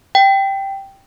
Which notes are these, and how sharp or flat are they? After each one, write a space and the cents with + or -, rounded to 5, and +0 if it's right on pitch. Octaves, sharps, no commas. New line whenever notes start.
G5 -5